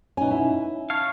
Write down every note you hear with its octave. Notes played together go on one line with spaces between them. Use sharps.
B2 C#4 D#4 G#5
E4
C#5 F5 A5